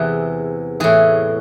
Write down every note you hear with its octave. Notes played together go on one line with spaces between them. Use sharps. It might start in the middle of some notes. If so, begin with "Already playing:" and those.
Already playing: E2 C3 E3 G#4
A2 E3 G#4